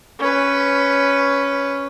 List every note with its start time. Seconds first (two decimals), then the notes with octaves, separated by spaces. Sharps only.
0.19 C#4 B4